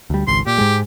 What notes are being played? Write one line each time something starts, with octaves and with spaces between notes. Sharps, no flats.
D2 G3
G#1 C#2 C6
A#2 G4
G#2 G#3